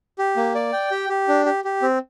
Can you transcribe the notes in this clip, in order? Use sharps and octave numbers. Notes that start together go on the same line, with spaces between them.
G4
A#3
D5
G5
G4
G4
D4
G4
G4
C4